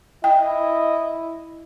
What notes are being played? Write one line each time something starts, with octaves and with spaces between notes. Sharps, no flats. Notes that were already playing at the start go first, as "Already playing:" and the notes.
E4 D#5 G5